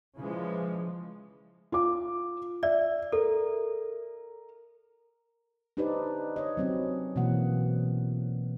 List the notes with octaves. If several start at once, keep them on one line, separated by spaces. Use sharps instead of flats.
C#3 E3 F3 G#3
F4 D6
D5 E5
A4 A#4
D4 D#4 G4 B4 C5 D5
C#5 D#5
F#3 C4 C#4
B2 E3 A#3 F#5